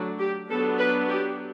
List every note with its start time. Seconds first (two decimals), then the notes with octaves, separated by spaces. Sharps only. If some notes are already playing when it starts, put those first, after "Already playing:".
Already playing: D3 F#3 A3 D4
0.20 G4
0.50 F#3 B3 D4 A4
0.79 B4
1.09 G4